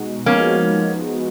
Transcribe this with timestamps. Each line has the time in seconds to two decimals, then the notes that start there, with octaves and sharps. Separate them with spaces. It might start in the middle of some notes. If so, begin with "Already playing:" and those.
Already playing: B2 G#3 D#4 F#4
0.26 F3 G#3 A#3 B3 C#4 D#4 F#4